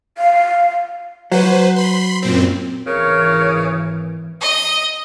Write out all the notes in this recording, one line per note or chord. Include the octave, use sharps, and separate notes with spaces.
F5
F#3 B4 C5
B5 C6
F#2 A#2 C4
G#1 C#3 E3 A#4 C#5
D#5